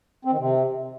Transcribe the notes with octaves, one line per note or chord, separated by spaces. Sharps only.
C4
D#3
C3